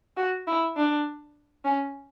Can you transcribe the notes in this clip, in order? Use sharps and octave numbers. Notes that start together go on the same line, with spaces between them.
F#4
E4
D4
C#4